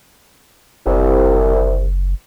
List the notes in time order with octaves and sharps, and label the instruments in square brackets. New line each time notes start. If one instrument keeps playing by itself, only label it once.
[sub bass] F#1 [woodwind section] C2